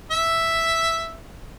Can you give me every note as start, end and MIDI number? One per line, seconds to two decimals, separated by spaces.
0.11 1.17 76